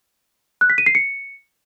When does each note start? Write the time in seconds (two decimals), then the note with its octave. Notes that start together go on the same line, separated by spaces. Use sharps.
0.61 F#6
0.70 B6
0.78 D#7
0.86 C7
0.95 C#7